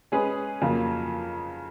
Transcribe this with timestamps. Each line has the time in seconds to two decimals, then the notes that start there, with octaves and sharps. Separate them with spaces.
0.12 G#3 C#4 G#4 B4
0.62 F2 C#3 F#3 A#3 F4